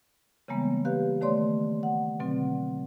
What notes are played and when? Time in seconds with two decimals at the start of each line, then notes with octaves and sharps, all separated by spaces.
0.48 C#3 E3 G3 G#3 A#3 B3
0.85 G4 B4 F5 F#6
1.21 D#3 A3 C#5 D5 C6
1.83 F#5
2.20 B2 D3 F#3 C4